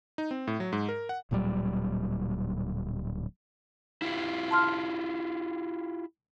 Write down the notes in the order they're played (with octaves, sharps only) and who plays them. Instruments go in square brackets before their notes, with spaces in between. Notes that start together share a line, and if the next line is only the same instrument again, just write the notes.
[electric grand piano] D#4
C4
A2
F#3
G#2
A#4
F#5
[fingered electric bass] D1 A#2 F#3 G3
[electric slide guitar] E4 F4 G4
[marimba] A5 C6 F6